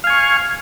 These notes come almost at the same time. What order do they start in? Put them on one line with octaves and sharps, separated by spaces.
F5 G#5 C#6